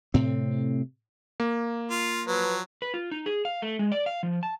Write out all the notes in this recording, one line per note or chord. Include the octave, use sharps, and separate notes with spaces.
A2 C3 C4
A#3
F4
F3 F#3 B4
B4
F4
D#4
G#4
F5
A3
G#3
D5
F5
F3
A5